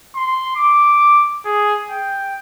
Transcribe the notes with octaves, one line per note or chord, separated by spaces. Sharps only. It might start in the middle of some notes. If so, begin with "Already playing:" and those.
C6
D6
G#4
G5